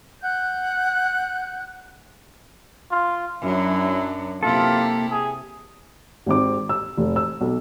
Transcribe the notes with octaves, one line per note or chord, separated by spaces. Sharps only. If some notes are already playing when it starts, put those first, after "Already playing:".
F#5 F#6 G6
F4
F#2 F#3 D4 E4
C3 A#3 E4 F4 G4 A4
G#4
G#1 G#2 C4 D6
E6
F1
E6
B1